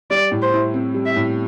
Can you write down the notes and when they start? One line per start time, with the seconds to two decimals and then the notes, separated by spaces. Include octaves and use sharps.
0.10 G3 D5
0.31 A2
0.42 C5
0.53 E4
0.74 C4
0.94 G3
1.06 E5
1.16 A2